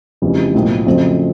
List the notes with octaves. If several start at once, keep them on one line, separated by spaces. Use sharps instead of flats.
F1 F2 C#3 E3 G3
B1 A2 F3 A#3
F2 C#3 F#3 A3 C4